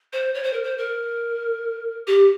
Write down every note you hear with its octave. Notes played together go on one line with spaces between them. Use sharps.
C5
C#5
C5
A#4
C5
A#4
G4